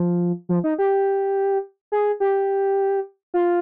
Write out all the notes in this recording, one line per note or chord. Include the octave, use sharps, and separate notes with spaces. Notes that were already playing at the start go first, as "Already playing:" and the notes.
Already playing: F3
F3
D#4
G4
G#4
G4
F4